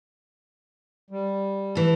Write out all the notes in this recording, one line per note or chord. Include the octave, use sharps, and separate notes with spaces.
G3
E3 A4